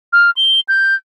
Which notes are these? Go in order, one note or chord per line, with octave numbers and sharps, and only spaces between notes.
F6
G7
G6